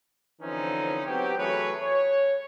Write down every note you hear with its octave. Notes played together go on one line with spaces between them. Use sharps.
D3 E3 F3 C4 C#4 D#4
F#3 B3 C4 F#4 G4
E3 F#3 A3 G#4 B4 C#5
C#5